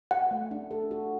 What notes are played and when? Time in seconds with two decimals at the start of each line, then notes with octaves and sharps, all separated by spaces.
0.11 F#4 F#5
0.31 A3
0.51 D4
0.71 A4
0.91 F#4